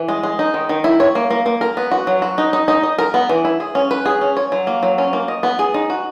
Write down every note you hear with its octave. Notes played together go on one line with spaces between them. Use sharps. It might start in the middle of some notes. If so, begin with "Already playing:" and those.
Already playing: E3
G#3
G#3
D#4
D#3
D#3
E4
C#5
A#3
A#3
A#3
A#4
B3
F#4
F#3
F#4
D#4
D#4
D#4
D#5
A#4
B3
E3
E4
G#4
C#4
B4
G#4
C#4
C#5
F#3
A#3
F#3
C#4
A#3
D#5
B3
G#4
D#4
F#4